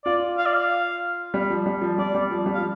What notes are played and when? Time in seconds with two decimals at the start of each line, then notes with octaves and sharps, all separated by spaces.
0.05 F4 D5
0.37 F5
0.46 D5
0.54 F5
1.34 G3
1.50 F3
1.66 G3
1.81 F3
1.98 G3 D5
2.14 G3
2.31 F3
2.46 G3
2.54 F3 F5